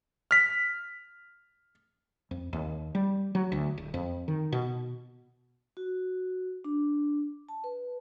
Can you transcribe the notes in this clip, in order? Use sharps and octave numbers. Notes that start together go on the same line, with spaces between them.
F6 B6
F2
D#2
G3
F#3
D2
D1
F2
D#3
B2
F#4
D4
A5
B4